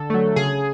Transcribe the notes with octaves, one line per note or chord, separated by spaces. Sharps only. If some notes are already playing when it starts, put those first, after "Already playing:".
Already playing: D3 A4
F#3 A3
C#3 G#4